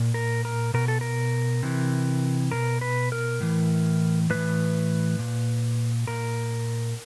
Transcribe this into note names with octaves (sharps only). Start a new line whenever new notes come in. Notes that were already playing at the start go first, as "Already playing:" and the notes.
Already playing: A#2
A#4
A#4
B2 A#4
A4
A#4
C3 E3
B2 A#4
B4
A#4
A2 E3
A2 E3 B4
A#2
A#2 A#4